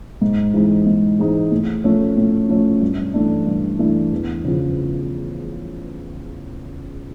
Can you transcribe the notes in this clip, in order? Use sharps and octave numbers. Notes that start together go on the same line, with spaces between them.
G#2
E3 G#3 C4 D#4
G#2
E3 G#3 C4 D#4
A2
F3 A3 C#4
A2
F3 A3 C#4
G2
E3 A3 D4
G2
E3 A3 D4
E2
C#3 F3